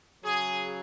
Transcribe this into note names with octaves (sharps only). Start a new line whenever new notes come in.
C#3 F#3 G#4